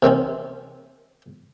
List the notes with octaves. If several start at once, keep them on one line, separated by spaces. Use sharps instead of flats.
C3 D#3 C4 C#4